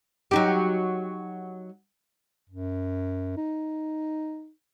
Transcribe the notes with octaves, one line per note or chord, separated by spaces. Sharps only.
F#3 D#4 G4
F#2
D#4